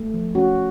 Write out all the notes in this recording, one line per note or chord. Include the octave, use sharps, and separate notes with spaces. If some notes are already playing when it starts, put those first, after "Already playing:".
Already playing: A3
F3
C#4 F#4